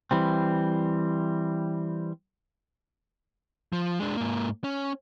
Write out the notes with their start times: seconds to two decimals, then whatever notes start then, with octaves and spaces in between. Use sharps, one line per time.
0.11 E3 G3 C4
3.73 F3
3.99 G#3 D4
4.17 G#2 A#3
4.64 C#4